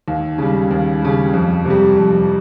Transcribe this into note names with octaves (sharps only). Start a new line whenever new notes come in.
D#2
C#3 G3
D#2
C#3 G3
F2
C3 G3
F2